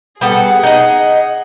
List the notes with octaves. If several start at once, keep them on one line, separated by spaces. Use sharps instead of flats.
G3 B3 G#4 A4 F#5
D#4 D#5